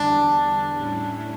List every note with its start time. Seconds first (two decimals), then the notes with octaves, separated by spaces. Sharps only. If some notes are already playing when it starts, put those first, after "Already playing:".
Already playing: E2 D3 G3 D4
0.75 A2 G3 C#4 E4